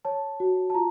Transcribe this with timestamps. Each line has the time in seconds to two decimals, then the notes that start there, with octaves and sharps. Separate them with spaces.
0.05 C#5 A5
0.40 F#4
0.70 A5
0.74 F4 A#5